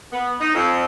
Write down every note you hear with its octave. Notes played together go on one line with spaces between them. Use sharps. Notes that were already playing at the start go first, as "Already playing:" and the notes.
B3
D#4
F2